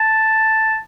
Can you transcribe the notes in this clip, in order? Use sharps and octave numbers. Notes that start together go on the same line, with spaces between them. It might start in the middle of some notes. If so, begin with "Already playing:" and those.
Already playing: A5